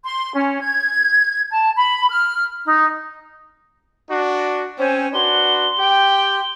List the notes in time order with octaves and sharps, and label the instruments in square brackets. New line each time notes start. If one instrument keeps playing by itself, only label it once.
[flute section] C6
C#4
G#6
A5
B5
F6
D#4
[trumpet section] D4 F#4
[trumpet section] C4 C#4 G#5 [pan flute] C5
[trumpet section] D4 F#4 B4 [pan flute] C6
[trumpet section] G4 G5